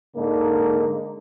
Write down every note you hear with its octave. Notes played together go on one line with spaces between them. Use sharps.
G#2 D3 A#3 D#4